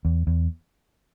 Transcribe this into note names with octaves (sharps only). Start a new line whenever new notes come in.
E2
E2